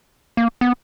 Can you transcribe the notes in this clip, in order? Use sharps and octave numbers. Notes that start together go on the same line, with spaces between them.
A#3
B3